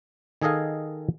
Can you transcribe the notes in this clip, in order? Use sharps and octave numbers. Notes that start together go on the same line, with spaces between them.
D#3 G#4 A4 D#5 F5 G#5